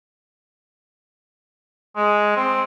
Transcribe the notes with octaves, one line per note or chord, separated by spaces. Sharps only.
G#3
C4